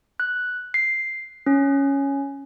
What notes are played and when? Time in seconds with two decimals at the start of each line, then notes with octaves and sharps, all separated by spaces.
0.20 F#6
0.74 C7
1.46 C#4